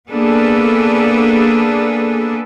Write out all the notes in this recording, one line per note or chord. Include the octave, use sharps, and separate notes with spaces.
A#3 B3 D4 G#4 A4 B4